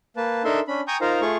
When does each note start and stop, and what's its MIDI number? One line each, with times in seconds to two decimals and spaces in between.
0.17 0.43 58
0.17 0.43 71
0.17 0.43 81
0.45 0.60 62
0.45 0.60 63
0.45 0.60 69
0.45 0.60 70
0.45 0.60 76
0.45 0.60 84
0.68 0.81 61
0.68 0.81 62
0.68 0.81 83
0.88 0.97 79
0.88 0.97 80
0.88 0.97 82
0.88 0.97 85
0.88 0.97 87
0.88 0.97 91
1.01 1.21 63
1.01 1.21 65
1.01 1.21 70
1.01 1.21 72
1.01 1.21 77
1.01 1.21 82
1.21 1.37 57
1.21 1.37 65
1.21 1.37 68
1.21 1.37 77
1.21 1.37 85